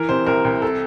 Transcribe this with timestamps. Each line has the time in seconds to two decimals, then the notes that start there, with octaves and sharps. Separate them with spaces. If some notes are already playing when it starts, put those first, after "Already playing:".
Already playing: E3 A#4
0.09 C3 C5
0.27 C2 A#4
0.45 C2
0.62 A4